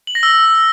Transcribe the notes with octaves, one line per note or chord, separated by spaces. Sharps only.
F#7
A#6
E6